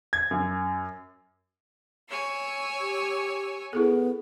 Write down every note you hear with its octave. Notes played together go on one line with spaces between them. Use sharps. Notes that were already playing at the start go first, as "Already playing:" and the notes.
G#6
F#2
C#5 G#5 E6
G4
B3 E4 G#4 A4